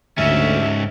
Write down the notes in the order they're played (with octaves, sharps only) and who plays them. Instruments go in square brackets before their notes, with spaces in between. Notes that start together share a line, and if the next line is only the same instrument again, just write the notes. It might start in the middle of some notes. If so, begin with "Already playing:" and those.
[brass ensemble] D2 [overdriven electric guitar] G#2 C#4 [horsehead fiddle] E5